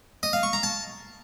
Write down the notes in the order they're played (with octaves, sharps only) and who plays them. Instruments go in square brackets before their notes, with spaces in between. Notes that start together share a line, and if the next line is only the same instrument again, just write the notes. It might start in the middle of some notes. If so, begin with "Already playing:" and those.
[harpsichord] D#5
F5
C#6
A#5
A5